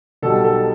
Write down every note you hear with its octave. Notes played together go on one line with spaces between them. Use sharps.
B1 B2 G3 A4
A4